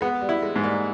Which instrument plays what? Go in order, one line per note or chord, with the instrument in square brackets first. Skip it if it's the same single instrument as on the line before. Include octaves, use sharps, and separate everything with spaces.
[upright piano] G#3 [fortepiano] B3
[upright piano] G3
[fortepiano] E4
[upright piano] G#3
[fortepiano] G#2
[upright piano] G3 A#3